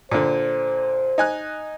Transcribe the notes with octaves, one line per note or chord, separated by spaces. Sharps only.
A#2 D3 C5
D#4 G#5 F#6